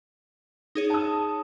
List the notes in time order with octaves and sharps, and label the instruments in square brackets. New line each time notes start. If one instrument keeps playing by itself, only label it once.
[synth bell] D#4 G#4 C#5
[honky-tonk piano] A5 D#6